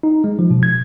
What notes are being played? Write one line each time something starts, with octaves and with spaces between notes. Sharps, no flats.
D#4
G#3
F3
B2
G#6